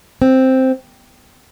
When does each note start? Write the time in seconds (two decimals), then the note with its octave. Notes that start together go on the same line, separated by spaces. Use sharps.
0.22 C4